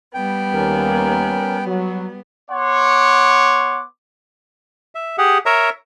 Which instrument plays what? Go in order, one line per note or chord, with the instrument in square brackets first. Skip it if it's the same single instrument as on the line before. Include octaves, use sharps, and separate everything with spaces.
[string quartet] G3 B3 [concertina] G5
[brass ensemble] D#2 A#3 [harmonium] C#4 A#4
[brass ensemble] F#3
[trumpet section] B3 C#5 F#5 C6 D6
[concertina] E5
G4 G#4 F#5
A#4 C#5 E5 A#5